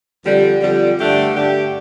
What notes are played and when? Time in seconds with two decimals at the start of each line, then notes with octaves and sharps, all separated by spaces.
0.25 F2 D3 G3
0.61 F2 D3 G3
0.98 G2 D3 A3 D4 G4
1.35 G2 D3 A3 D4 G4